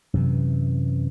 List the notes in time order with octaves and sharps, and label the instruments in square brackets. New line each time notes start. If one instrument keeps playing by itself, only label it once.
[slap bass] F#2 C3 E3